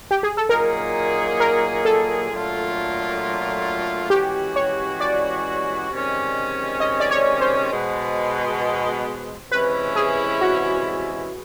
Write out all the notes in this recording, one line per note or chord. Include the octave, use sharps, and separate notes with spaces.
G4
G#4
A4
A#2 F#3 A#3 D#4 G#4 A#4
A#4
A4
A#2 F#3 A3 D4 F4
E3 G#3 C#4 F#4 G4
C#5
D5
C3 D#3 G#3 C#4
D#5
D5
C#5
C5
B2 G#3 B3
C3 E3 G#3 C#4 E4 B4
G#4
F#4